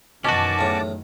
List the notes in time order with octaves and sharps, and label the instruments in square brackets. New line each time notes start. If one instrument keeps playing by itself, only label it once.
[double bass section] F#2 D#3 E3 [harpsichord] B2 [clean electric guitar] C#4 F#4 [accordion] A5 D6
[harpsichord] E2 A2